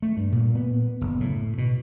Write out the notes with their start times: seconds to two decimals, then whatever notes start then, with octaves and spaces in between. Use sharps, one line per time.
0.02 A3
0.17 G2
0.32 A#2
0.55 B3
1.01 F#1
1.20 A2
1.58 B2